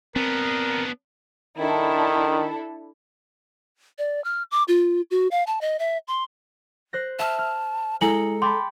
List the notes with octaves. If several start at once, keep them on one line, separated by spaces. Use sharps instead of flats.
B3 C4 D4 A#4
D#3 D4 E4 A4
D5
F6
D6
F4
F#4
F5
A5
D#5
E5
C6
C5 F#6 A#6
E5 A5 E6 F6
F6
G#3 E4 A4 G#5 A#5 C#7 F#7
G5 A5 B5 C6 D6